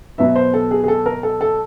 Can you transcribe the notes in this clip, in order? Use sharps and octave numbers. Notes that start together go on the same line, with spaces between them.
B2 F#3 B3 E5
C5
A4
G#4
G#4
A4
A#4
A4
A4